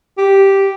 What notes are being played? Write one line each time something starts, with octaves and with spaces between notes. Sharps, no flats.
G4